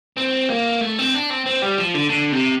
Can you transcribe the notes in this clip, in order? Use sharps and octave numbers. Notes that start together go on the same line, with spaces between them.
C4
A#3
A3
C4
D4
C4
C4
G3
F3
D3
D3
C3